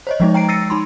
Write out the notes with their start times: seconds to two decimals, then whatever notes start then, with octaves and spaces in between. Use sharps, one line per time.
0.07 C5 C#5 D#5
0.20 F3 G#3 D#4
0.34 G5 A#5 C7 D7
0.49 E6 A6 A#6 C7 C#7 D#7
0.70 D#4 B5 C6